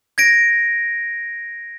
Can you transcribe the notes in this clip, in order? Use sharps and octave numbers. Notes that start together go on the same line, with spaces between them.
G#6 A#6 D7